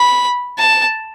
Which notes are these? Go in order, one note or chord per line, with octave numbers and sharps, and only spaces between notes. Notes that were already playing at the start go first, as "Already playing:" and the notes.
Already playing: B5
A5